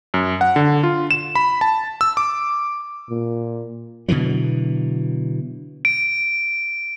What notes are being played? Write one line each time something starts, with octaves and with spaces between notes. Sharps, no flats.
F#2
F#5
D3
F4
E7
B5
A5
E6
D6
A#2
B2 D3 E3 F#3
D7